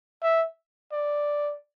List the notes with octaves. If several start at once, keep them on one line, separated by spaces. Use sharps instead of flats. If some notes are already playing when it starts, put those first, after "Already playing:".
E5
D5